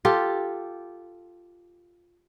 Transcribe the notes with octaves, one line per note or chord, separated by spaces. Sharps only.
F4 G4 A4